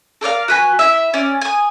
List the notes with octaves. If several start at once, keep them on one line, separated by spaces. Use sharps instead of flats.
A4 A#4 D5 F5
F#4 B4 G#5
E4 E5
C#4 D5
G#5 D#6